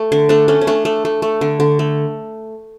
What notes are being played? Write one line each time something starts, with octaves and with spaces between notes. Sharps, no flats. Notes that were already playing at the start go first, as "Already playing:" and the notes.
Already playing: A3
D3
A3 D4
A3 C#4
C#4
A3 D4
A3
A3
A3
D3
D3
A3